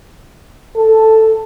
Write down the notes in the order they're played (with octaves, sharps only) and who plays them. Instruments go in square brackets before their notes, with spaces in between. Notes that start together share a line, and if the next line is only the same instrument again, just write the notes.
[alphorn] A4